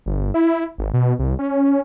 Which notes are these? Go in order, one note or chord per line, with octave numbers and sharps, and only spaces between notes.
G1
E4
G#1
B2
C2
C#4